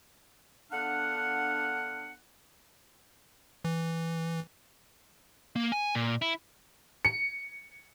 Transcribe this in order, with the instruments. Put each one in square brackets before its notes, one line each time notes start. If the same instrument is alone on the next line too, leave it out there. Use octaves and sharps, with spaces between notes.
[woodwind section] D3 B3 D4 F5 F#5
[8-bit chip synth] E3
[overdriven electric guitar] A#3
G#5
A#2
E4
[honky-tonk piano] C#7